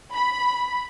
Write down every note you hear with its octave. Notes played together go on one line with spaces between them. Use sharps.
B5